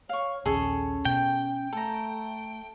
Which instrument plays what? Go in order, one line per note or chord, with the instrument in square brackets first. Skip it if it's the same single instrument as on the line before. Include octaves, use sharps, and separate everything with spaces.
[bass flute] C#5 [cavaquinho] F5 C#6
[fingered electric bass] A#1 D#2 [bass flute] C#4 [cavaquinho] G#4 A4 C#5
[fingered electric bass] B2 B3 [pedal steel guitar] G5
[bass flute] A3 [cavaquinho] A4 A#5